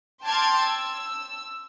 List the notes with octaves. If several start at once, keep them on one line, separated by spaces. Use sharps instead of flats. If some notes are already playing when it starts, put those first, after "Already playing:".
G5 A5 C6 D6 F6 G#6
E6